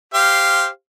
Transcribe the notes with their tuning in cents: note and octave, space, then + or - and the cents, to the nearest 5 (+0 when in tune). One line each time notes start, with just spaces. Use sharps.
G4 +0 C5 +0 F5 -10